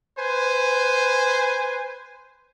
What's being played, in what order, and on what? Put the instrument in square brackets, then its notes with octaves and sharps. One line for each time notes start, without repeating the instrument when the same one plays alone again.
[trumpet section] B4 C5 G#5